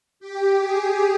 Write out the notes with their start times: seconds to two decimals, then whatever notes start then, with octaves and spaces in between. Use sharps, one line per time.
0.20 G4
0.60 G#4